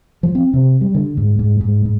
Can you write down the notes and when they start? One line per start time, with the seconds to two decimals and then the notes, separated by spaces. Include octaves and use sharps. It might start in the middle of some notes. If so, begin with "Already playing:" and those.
0.23 F3
0.35 C4
0.53 C3
0.81 G3
0.94 D3
1.17 G#2
1.39 G#2
1.61 G#2
1.85 G#2